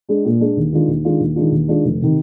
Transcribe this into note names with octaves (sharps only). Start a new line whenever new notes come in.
G#3 D4 G#4
A#2
G#3 D4 G#4
D#2
D#3 G#3 D4 F4
D#2
D#3 G#3 D4 F4
D#2
D#3 G#3 D4 F4
D#2
D#3 G#3 D4 F4
F1
C3 D#3